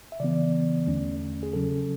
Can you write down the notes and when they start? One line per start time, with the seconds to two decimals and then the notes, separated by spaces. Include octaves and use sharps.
0.12 E5
0.20 C#3 E3 B3 D5
0.87 E2 D3 A3 C#4
1.43 G#4
1.53 C#3 F#3 C#4 A4